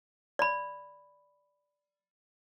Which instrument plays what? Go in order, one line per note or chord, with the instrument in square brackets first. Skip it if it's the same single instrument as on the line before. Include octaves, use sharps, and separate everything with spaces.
[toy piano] D5 B5